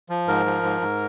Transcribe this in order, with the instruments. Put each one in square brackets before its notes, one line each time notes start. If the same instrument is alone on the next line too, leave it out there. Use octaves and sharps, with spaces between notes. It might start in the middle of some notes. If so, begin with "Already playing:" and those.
[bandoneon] F3
G#2 A#4
F3
G#2
G#2